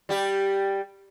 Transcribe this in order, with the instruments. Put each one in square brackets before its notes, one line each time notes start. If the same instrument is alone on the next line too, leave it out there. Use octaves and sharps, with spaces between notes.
[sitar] G3 G4